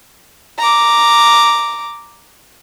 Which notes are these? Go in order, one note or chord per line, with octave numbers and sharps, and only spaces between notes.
A#5 D6